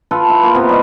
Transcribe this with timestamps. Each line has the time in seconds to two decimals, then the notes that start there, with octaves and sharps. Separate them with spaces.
0.11 F4 A4 B4
0.30 E4
0.43 A#3 F4 A4
0.54 C3 B3 A#4
0.69 G3 D#4 E4